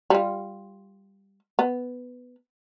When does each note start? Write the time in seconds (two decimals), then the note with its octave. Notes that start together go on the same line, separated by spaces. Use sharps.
0.10 G3 F4
1.59 B3